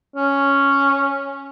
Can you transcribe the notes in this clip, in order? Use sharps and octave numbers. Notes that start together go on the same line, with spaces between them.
C#4